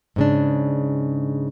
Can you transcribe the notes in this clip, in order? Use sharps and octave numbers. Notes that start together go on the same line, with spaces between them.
G#2 C#3 D4